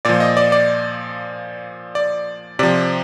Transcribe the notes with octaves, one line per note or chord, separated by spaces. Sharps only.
A#2 F3 D5
D#5
D5
D5
D5
C3 F3 D5